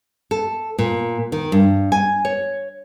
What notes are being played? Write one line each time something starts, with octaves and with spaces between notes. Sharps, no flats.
A4
A#2
D#3
G2
G#5
C#5